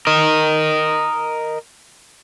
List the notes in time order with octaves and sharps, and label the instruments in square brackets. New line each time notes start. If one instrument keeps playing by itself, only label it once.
[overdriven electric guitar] A#4 D#5